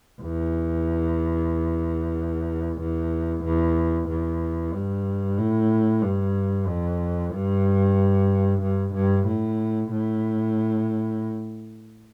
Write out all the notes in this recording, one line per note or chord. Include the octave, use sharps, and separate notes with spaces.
E2
E2
E2
E2
G2
A2
G2
F2
G2
G2
G2
A2
A2